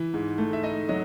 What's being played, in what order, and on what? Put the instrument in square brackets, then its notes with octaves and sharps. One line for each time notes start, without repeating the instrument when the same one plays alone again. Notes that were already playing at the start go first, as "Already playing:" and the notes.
Already playing: [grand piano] E3
G#2
A3
E5
D#4 D#5
F#3 D#5